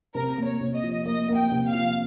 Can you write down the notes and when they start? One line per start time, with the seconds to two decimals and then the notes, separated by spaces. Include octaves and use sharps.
0.15 C3 A#4
0.38 A#3
0.45 C#5
0.61 C3
0.75 D#5
0.83 F3
1.05 A#3 D#5
1.29 A#3
1.36 G5
1.52 C3
1.67 F5
1.74 F3